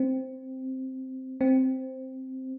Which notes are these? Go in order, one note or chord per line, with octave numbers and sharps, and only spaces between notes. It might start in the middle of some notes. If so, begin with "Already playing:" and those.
Already playing: C4
C4